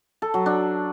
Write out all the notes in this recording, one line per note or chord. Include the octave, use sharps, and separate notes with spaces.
A4
F#3
D4